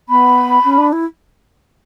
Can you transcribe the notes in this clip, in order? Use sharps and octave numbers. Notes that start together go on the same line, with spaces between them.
B3 B5
C#4
D4
E4